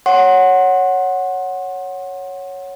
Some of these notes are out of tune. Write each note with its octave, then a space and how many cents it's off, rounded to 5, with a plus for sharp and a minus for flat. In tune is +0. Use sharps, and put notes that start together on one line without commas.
C#5 +0 F#5 +0 C6 +25